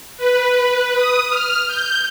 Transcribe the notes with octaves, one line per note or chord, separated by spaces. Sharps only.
B4
D#6
F6
G6